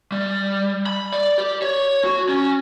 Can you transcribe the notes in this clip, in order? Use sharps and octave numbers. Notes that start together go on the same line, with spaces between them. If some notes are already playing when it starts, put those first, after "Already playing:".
G3
B5
D5
G4
C#5
F#4
C#4